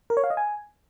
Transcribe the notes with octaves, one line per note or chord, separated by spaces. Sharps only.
A#4
C#5
F5
D#5
G#5